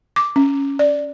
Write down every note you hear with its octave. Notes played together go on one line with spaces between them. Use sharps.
D6
C#4
D5